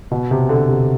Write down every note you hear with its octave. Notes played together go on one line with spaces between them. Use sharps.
B2
C3
D3
C3